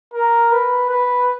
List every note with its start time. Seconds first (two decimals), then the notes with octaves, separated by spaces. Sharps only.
0.14 A#4
0.52 B4
0.89 B4